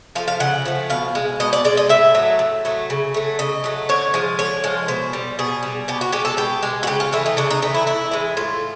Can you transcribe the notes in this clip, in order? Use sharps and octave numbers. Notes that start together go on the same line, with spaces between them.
F3 A3 F5
F5
C#3 F#5
F3 A3
B2 F5
G#3
B2 D#5
D5
G#3 D5
D#5
A2 E5
F#3 A3
A2
F#3 A3
C#3
F#3 A3
C#3 D#5
F#3 A3
D3 C#5
F3 G#3
D3 C#5
F3 G#3
B2 C5
G3
B2 G#4
G3
B2 G4
F#4
G#3 G4
A4
B2 G4
G#3
F#4
C#3 G4
F4
E3 A3 E4
D#4
C#3 D4
D#4
E3 A3 D#4
E4
A2 E4
E3 G#3
A2 F4